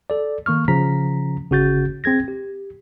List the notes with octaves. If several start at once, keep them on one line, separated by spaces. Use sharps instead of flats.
A4 D5
D#3 A#3 C#6 F6
C#3 F3 A#5 B6
G1 C#3 F#4 G6 A6
C4 G#4 G#6 A#6
G4